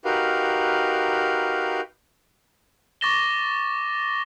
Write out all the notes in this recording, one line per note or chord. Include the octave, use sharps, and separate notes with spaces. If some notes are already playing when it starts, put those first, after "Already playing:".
D#4 F#4 G4 A#4 B4 F5
C#6 D6 A6 A#6 E7 G7